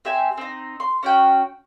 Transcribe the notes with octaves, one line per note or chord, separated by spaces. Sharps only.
C4 G4 E5 G#5
C4 D#4
C6
C#4 F#4 G5